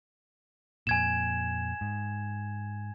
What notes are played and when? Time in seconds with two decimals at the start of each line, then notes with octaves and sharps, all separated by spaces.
0.87 F2 A#2 G#5 G#6 E7
1.81 G#2